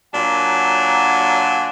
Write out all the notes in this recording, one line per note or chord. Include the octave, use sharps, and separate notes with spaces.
A#2 F#3 D4 F#5 G#5